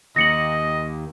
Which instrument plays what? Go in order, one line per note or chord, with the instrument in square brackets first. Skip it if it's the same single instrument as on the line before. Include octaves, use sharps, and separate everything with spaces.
[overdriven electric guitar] D#2 [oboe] D#5 [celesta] A#6 C#7 F#7